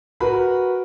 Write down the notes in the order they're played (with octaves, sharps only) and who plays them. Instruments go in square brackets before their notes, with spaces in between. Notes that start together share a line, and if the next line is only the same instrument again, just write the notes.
[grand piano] F#4 A#4 B4 B5